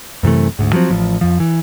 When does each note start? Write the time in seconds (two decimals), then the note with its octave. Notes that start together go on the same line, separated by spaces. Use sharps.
0.23 F#2 C3 E3 A3
0.59 D2 G#2
0.73 F3 F#3 G#3 C4
0.90 A1 F3
1.21 F2 F3
1.40 E3